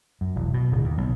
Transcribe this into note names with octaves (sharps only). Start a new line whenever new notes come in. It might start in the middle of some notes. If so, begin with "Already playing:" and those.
F#2
E1
B2
D1
D#2
B1